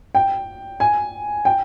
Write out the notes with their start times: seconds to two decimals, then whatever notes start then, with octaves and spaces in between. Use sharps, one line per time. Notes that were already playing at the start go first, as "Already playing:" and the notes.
0.15 G5
0.80 G#5
1.45 G5